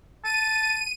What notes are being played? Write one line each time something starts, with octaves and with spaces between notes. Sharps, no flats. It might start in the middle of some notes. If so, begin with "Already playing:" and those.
A5 D#7